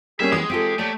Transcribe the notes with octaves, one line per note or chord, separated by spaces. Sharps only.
G3 A#3 C#4 G#4 E5
E3 G#3 B3 G4 D#6
C4 F4 G4 A4
A3 A#3 G4 C#5 D5